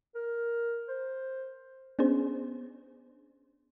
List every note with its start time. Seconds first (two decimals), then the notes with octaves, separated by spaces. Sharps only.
0.15 A#4
0.88 C5
1.99 B3 C#4 D4 G#4 C5